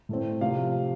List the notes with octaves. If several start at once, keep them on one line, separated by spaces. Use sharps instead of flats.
A2 A3 C4
C3 F3 A3 F5